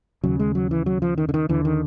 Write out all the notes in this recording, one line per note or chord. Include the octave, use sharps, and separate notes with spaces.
D#2 C#3 F#3
G#3
F#3
E3
F#3
F3
D#3
D3
D#3
D#2 D3 E3
D#3